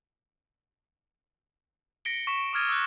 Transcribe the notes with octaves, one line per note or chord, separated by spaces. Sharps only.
A#6 B6 C#7 D7 G7
C#6 B6 E7
D6 D#6 F6 G#6 A6 D#7
E6 F#6